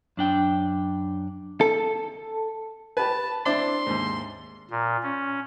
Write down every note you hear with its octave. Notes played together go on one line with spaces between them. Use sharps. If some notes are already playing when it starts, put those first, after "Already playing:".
F#2 D4 G5
A4
G4 B4 A5
C4 D4 E4 C6
D#2 G#2
A#2
C#4